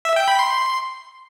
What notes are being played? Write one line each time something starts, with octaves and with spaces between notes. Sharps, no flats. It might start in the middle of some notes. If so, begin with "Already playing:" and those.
E5
G5
B5
C6